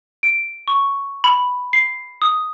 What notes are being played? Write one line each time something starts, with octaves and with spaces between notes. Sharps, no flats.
D7
C#6
B5
C7
D#6